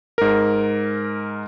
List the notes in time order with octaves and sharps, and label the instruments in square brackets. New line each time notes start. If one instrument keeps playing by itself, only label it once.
[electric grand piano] G#2 A#4